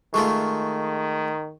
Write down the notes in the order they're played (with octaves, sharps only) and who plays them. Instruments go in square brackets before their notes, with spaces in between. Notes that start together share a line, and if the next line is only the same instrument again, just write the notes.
[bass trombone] D#3 [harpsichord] G#3 A3 F4 [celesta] C#6